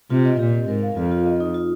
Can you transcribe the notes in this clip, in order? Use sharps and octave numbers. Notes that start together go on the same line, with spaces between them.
C3 F4
D#5
A#2 G4
C4
G#2 A#4
F5
F2 F4
F4
D#5
D#4
F4